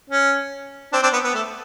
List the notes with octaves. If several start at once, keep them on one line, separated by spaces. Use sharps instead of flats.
C#4
C4 D4
C4 D4
B3
B3
A3